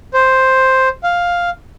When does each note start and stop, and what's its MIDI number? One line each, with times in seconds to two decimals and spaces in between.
0.14 0.89 72
1.03 1.50 77